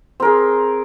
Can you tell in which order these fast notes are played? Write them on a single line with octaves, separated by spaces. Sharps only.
C4 A#4 G#4